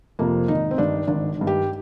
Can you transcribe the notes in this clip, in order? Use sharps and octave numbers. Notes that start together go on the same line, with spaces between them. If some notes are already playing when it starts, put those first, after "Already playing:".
F2 C3 F3 A#3
G#1 D#4
C4
G2 D#3 D4
G#1 D4
G2 D#3
G4